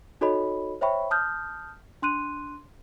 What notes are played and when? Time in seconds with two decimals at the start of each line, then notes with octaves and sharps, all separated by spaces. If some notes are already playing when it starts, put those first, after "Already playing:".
0.21 D#4 F#4 A4 C#5 D#5 B5
0.81 C5 C#5 E5 G5 B5 C#6
1.11 A5 D#6 F6 G6
2.02 D4 C6 F#6 D#7